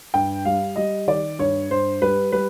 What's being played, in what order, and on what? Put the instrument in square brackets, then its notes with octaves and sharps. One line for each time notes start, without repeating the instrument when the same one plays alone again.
[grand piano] G2 G5
G3 F5
G3 D#5
D#3 D5
G2 C#5
G2 C5
G3 B4
G3 B4